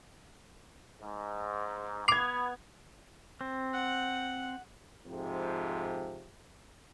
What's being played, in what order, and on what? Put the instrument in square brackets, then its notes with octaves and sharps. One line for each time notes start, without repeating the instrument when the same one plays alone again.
[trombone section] G#2
[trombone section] B3 [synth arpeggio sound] D6 C7 [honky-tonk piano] G#6 F7
[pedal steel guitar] C4
[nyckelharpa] F#5
[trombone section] F2 G#2 C3 F3